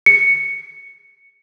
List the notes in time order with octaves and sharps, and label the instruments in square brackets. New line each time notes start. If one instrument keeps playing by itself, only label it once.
[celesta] C#7